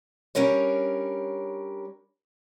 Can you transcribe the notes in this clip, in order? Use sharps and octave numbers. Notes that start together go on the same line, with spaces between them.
G3 C#4 D4 A#4 C#5